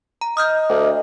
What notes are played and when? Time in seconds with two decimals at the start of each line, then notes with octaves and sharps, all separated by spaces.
0.21 A#5
0.37 D#5 D#6 F6 G6
0.69 D2